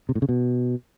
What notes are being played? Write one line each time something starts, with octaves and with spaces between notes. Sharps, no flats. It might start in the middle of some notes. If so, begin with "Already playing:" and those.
C3
A2
C#3
B2